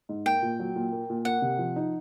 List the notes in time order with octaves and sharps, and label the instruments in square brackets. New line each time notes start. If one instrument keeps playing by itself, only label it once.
[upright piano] G#2
[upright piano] A#3 [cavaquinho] G5
[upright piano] A#2
F#3
A#2
A#3
A#2
[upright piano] A#3 [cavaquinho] F#5
[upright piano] C3
F3
D#4